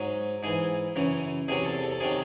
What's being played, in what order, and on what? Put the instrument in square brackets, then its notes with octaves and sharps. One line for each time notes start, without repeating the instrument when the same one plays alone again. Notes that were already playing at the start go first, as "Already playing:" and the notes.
Already playing: [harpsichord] G#2 F#3 G#4
G#2 E3 G#4
F#2 C#3 E3
E2 C3 F#3 G#4
A4
A4
C3 D#3 F#3 G#4